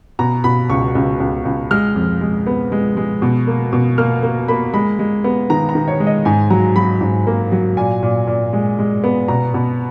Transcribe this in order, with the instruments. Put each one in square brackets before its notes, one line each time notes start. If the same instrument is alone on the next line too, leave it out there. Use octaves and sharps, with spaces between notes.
[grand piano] B2 A#5
B2 B5
C#2 C#6
C#2
C#2
C#2
G#3 F6
F2
G#3
B3
G#3
G#3
B2
A#3
B2
A#3 F6
A#3
A#3 B5
G#3 B5
G#3
B3
D#3 A#5
A#5
D#3
C#5
G#3
D#5
G#2 G#5
F#3 A#5
F#3 B5
G#2
A#3
F#3
A#2 G#5
A#2
A#2
G#3
G#3
B3
B2 A#5
B2